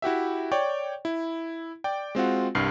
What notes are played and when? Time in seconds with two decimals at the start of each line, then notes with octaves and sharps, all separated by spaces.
0.02 E4 F#4 G4 E5
0.51 C#5 D5 G5
1.05 E4
1.84 D5 G5
2.15 G#3 C4 F4 F#4
2.55 C2 G2 F6 C7